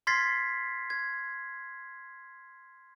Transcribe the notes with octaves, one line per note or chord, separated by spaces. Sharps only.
C6 F6 G#6 A6 B6 C7
G#6